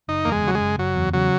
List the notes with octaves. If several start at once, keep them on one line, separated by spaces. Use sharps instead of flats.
F#1 D#4
E2 A#3
G#3
C#3 F#3
G#3
F#1
F#1 F#3
E2
C#3 F#3